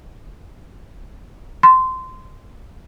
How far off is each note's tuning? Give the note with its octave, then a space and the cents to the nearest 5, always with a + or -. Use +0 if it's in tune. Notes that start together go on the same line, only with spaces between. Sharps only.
C6 -15